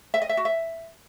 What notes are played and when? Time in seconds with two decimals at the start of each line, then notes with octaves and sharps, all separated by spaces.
0.14 E5
0.22 D#5
0.29 E5
0.37 F#4
0.45 E5